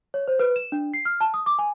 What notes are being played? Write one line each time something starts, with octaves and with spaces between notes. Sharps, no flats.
C#5
C5
B4
E7
D4
C7
F6
A5
D#6
D6
G#5